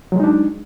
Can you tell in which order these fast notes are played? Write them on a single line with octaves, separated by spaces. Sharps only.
F#3 G#3 D#4 D4